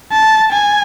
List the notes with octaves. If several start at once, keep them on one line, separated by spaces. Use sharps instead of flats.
A5
G#5